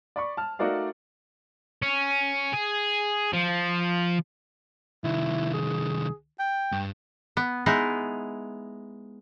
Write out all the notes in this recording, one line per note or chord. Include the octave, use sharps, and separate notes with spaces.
D5 B5 C#6
A5 F6
A3 D#4 F#4 A#4 D5 F5
C#4
G#4
F3
C2 D#3 E4
G#4
G5
G2
B3
G#3 B3 D#4 E4